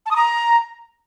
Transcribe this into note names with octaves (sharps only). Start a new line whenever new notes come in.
A5
D#6
A#5